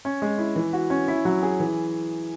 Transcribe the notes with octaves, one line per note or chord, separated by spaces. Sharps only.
C#4
G#3
E4
E3
F#4
C#4
E4
F#3
G#4
E3